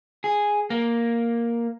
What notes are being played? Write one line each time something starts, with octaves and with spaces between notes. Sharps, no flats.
G#4
A#3